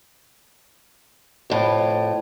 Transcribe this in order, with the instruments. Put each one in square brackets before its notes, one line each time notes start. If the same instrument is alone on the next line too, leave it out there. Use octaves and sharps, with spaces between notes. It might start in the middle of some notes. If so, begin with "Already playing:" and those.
[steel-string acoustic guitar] F2 A2